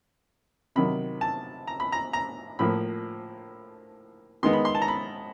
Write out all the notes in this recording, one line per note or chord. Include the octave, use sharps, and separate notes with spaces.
C3 D#3 F#3 B5
A5
A#5
B5
A#5
A#5
A2 F3 A#3 B5
D#3 G#3 B3 D#4 C6
B5
C6
A5
A#5
B5